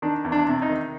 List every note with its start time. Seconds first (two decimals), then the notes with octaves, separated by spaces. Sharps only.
0.02 D#3 D4
0.25 E2
0.32 D4
0.47 C3
0.62 D#4
0.69 D#3